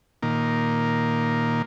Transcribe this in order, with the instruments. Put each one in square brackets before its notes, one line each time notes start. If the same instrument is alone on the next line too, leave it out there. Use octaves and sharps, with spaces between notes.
[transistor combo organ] A#2 D#3 A#3